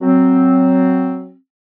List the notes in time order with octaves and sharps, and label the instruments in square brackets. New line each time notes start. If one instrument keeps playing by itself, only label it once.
[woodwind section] F#3 C4